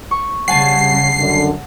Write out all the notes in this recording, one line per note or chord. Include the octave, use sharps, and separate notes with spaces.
C#6
C#3 G3 F#5 G#5 A5 C7
F#2 D3